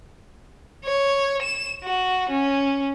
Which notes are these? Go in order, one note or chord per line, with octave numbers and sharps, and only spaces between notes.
C#5
E7
F#4
C#4